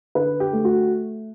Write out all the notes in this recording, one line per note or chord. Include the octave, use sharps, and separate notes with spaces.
D3 B4
G4
A3
F#4